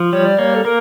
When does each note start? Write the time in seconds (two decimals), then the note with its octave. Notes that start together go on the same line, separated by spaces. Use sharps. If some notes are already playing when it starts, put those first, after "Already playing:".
Already playing: F3
0.12 G3 C#5
0.25 D5
0.39 A#3 C#5
0.55 A4
0.64 A#3 A#4